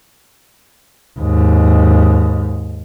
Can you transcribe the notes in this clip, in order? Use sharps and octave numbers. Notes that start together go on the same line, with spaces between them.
D#2 G#2